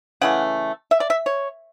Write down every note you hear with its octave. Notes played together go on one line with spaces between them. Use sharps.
C#3 E3 A3 F#5
E5
D5
E5
C#5